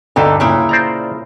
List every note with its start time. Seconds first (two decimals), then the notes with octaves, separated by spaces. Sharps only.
0.16 D2 G2 D3 D#4 A4
0.40 A#2 C#3 E4
0.69 C5 D5 A#5